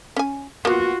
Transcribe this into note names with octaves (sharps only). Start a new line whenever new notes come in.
C#4 G#5
A#3 B3 F4 F#4